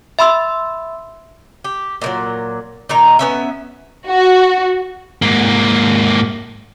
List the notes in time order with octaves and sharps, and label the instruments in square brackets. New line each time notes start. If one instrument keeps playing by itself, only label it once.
[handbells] E5 B5 C6 E6
[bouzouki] G4
A#2 E3 F#3
A#2 D#3 A#5
B3 C#4 E5
[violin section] F#4
[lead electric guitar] G#2 A#3